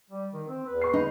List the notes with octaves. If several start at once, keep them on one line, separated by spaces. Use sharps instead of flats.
G3
D#3
C4
E2 B4
C#6 C7
C#3 D#4 B5